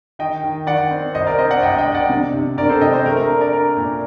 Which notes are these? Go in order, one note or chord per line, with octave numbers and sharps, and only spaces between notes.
D#3 D#5 G5
D#3
D#3 D5 F#5
C4
C2 C5 D#5
A#4 D5
C4 C5 D#5
D5 F#5
C2 D#5 G5
D#5 G5
C2
D5 F#5
C3
C3
C3 A#4 D5
A4 C5
C3 D#5 G5
C5 D#5
A3 A#4
A#4
D4 A#4
A#4 D5
D4 A#4
A#2